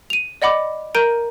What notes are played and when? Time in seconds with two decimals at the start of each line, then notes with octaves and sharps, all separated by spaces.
0.10 D#7 F7
0.42 D5 D#5 F#5 B5 D6
0.95 A#4 A#5 G6 D7 D#7